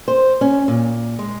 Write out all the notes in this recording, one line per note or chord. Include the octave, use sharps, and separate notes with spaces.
C5
C#4
A#2
G#3